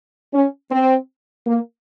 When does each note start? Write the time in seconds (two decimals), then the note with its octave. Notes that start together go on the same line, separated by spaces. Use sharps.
0.34 C#4
0.71 C4
1.47 A#3